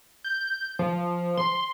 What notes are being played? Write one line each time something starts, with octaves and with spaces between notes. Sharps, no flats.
G6
F3
C6